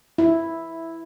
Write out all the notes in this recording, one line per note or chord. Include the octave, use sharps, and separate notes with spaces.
E4